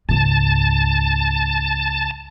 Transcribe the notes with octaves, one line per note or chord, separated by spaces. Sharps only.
C#2 G#2 A5